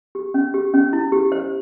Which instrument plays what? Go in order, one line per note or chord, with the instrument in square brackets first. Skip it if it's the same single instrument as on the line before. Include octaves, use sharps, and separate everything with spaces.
[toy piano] G4
C#4
G4
C#4
E4
G4
C5